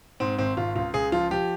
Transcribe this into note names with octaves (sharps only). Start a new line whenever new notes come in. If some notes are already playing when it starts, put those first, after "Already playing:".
G#2 C4
G#1 C4
G#1 F4
C#2 F4
C#2 G#4
F3 F4
F3 G4